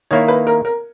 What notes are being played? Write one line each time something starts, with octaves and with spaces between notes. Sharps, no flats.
D#3 A#3 E4 C#5
B4
A#4
A#4